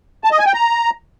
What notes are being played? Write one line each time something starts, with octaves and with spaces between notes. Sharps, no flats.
A5
D#5
G#5
G5
A#5